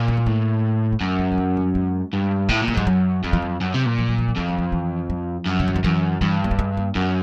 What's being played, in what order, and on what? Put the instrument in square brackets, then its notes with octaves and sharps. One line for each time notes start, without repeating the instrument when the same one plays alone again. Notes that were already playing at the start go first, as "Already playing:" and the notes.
Already playing: [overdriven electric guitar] A#2
[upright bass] C#4
C4
[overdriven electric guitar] A2 [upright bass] A#3
[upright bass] G#3
[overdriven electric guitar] F#2 [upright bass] A3
[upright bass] G#3
F3
F#3
G3
G#3
[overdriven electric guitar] G2
[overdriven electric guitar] A2 [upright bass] A3
[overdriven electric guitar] A#2
[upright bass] G#3
[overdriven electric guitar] G#2 [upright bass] G3
[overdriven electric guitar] F#2 [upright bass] F#3
[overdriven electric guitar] F2 [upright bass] F#3
[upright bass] F3
F#3
[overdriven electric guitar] F#2
C3
A#2
[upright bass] F3
F#3
F3
F#3
[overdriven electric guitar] F2 [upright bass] F3
[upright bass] F#3
F3
E3
F3
[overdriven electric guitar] F#2
[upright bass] C#3
D3
D#3
[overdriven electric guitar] F#2 [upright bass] E3
[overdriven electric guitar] G2 [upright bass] E3
[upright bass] A#3
A3
G#3
A#3
[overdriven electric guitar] F#2 [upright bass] B3